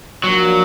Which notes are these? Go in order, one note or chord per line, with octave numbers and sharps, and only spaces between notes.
F3 F#3 A#3 D4 F#4